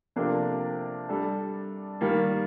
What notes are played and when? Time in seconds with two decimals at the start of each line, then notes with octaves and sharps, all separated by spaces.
0.16 C3 F3 A#3 D4 A4
1.09 G3 D4 A4
2.01 D#3 G3 A#3